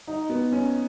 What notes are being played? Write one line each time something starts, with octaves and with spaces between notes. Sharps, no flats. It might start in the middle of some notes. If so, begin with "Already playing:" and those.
D#4
B3
C#4